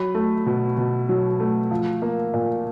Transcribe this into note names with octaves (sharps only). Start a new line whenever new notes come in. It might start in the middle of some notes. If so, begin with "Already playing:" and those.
Already playing: F#3 B5
A3
B2
B2
F#3
A3
F3
A#3
A#2